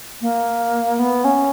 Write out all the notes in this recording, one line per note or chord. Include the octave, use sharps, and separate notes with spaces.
A#3
B3
C#4